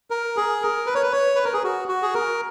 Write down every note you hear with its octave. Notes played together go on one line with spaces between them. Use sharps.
A#4
G#4
A#4
B4
C#5
B4
C#5
B4
A#4
G#4
F#4
F#4
G#4
A#4